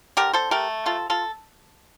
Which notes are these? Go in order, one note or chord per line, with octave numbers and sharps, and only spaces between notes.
D3 G4 A#4
A4 C5
A3 G4 A#4
C3 F4 A4
F4 A4